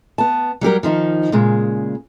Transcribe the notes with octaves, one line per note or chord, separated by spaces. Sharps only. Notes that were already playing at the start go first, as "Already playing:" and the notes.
B3 A5
F#3 G3 G4 A#4
D#3 F3 D#4
A#2 C#3 G#3